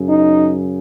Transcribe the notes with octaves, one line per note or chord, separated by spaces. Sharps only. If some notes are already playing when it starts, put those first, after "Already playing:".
Already playing: F#2 C#3
D#4